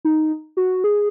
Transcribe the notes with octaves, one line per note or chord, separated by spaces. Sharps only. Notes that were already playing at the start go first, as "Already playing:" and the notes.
D#4
F#4
G#4